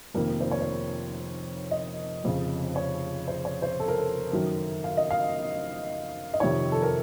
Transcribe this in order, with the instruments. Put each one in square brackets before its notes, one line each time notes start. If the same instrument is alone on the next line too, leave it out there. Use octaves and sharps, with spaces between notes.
[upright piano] F1 F2 D#3 A#3 A#4
C5
C#5
C5
D#5
F1 F2 C#3
C#5
C5
C#5
C5
A4
A#4
A4
F#2 D#3 F#3 A#4
F5
D#5
F5
D#5
F2 C3 D#3 C#5
A4
A#4